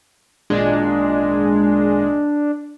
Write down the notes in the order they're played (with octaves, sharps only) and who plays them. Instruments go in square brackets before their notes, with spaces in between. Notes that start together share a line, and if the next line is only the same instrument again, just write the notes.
[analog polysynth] G#1 A#2 G#3 [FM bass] D4